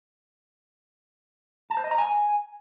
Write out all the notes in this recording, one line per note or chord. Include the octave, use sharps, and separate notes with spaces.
A5
C5
D#5
A#5
G#5